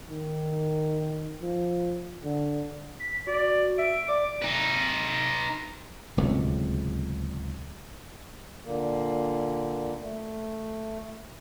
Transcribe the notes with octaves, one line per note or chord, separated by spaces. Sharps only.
D#3
F3
D3
B6
F#4 D5
E5 D7
D5 D6
D#4 B4
D1 C#2 C3
A#2 D3 A#3
A3